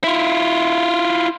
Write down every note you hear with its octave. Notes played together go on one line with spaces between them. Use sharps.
E4 F4